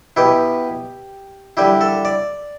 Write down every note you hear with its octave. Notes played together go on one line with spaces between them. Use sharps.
B2 B3 E4 G4
D3 G3 E4 G4
A4
D5